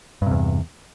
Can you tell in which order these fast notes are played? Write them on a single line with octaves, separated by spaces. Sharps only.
G2 C3 E2